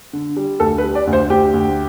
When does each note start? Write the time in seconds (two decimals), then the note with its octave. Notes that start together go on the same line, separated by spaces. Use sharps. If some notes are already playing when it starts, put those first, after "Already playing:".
0.13 D3
0.37 G3
0.60 D2 A4
0.78 B4
0.83 G3
0.95 D5
1.07 D2
1.13 C5
1.30 D2 G4
1.54 D2